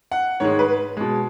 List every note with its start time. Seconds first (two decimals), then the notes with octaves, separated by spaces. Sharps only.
0.12 F#5
0.40 G#2 D#3 G#3 C#5
0.59 B4
0.97 B2 G#3